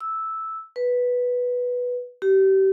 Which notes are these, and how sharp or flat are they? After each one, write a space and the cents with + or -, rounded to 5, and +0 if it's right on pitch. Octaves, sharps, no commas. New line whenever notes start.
E6 -5
B4 -5
G4 -30